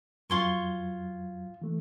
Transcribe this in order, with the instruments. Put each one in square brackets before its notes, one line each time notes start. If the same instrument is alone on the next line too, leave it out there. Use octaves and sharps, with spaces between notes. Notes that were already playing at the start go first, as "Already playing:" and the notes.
[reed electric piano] F2 F#3 G#6 [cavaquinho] F4 C6 C#6
[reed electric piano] E3 A3